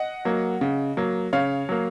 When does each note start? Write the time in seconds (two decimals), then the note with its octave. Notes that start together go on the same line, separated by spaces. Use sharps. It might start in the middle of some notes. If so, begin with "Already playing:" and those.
Already playing: D#5 F#5
0.25 F#3 A#3
0.61 C#3
0.97 F#3 A#3
1.33 C#3 C#5 F5
1.69 F#3 A#3